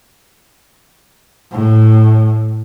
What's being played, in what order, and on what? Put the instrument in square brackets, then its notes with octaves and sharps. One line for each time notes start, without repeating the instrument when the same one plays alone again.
[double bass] A2